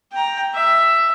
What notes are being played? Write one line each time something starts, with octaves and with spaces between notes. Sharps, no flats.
G5 A#5
E5